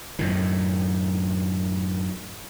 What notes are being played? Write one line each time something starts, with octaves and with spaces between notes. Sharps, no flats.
F#2 A2 D#3